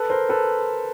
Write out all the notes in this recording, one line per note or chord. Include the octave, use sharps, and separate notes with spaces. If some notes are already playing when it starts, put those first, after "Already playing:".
Already playing: A4 B4
A#4 C5
A4 B4